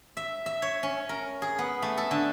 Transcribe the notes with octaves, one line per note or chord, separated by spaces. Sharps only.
E5
E5
C#5
C#4
A#4
G#4
B3
A3
A4
D3